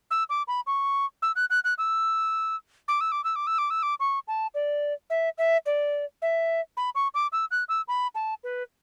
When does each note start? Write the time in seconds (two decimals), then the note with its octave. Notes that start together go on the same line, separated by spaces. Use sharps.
0.11 E6
0.29 D6
0.48 B5
0.67 C#6
1.22 E6
1.36 F#6
1.50 F#6
1.64 F#6
1.78 E6
2.88 D6
3.01 E6
3.12 D6
3.24 E6
3.36 D6
3.47 E6
3.58 D6
3.70 E6
3.82 D6
4.00 C#6
4.28 A5
4.54 D5
5.10 E5
5.38 E5
5.66 D5
6.22 E5
6.77 B5
6.95 C#6
7.14 D6
7.32 E6
7.51 F#6
7.68 E6
7.88 B5
8.15 A5
8.44 B4